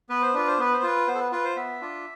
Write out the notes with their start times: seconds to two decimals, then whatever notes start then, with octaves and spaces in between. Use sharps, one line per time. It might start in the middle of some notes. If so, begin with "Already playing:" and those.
0.09 B3 B4
0.22 C5
0.34 D4 F4 B4
0.48 C5
0.58 B3 B4
0.73 C5
0.83 F4 B4
1.07 B3 C5
1.15 A4
1.20 B4
1.32 F4 B4
1.44 C5
1.56 B3 E5
1.81 D4 F4